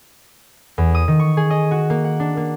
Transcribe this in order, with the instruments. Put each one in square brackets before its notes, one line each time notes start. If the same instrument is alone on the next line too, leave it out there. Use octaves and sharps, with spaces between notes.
[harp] E2
D#6
D#3
C#6
G#4
D#5
F#4
A#3
F#5
D4
A#3